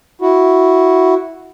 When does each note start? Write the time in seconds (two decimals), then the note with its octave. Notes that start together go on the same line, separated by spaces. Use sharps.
0.21 E4 F#4